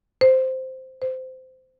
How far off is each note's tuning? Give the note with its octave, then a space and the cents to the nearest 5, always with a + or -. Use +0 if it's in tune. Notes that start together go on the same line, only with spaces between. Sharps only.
C5 -5
C5 -15